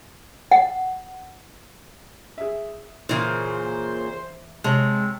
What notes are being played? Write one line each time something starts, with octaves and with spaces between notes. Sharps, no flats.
F#5
G#4 E5
A#2 C#3 E3 C5
C3 G#3 C#5 A5 C6